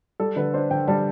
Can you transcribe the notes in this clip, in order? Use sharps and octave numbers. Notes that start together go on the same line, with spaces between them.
G3 A4
D3 B4
D4 C5
D3 G5
G3 A5